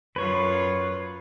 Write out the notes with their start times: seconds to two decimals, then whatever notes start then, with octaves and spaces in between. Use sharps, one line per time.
0.16 F#2 F4 B4 C#5